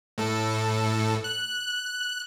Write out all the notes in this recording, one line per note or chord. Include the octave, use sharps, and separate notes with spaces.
A2 A4
F#6